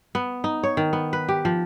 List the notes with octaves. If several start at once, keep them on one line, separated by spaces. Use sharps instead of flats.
B3
D#4
C#5
D#3
B3
B4
G4
F3